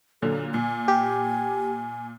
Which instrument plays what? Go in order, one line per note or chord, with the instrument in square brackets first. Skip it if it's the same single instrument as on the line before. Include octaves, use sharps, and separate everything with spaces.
[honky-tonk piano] A#2 D3 F#3 [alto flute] A4
[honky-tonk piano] A#2 [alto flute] G#5
[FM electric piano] G4